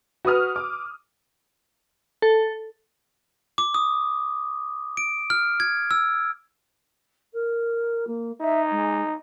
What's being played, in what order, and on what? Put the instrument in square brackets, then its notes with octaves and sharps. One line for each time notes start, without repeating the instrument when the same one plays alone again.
[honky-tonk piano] F#4 B4 D#6 F6
D6
[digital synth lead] A4
[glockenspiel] D6
D#6
D7
F6
G#6
E6
[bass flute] A#4
A#3
[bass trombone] D#4 [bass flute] E5
[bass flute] G#3